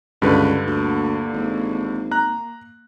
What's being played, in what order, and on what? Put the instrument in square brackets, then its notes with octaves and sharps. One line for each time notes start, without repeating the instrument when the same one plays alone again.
[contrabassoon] C#2 [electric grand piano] G2 D3 B4
[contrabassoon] D2 [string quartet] A#3
[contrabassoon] G#1
[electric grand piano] A#5 F#6